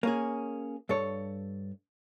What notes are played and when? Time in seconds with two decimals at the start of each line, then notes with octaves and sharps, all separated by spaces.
0.03 A#3 C#4 G#4
0.89 G2 A4 C#5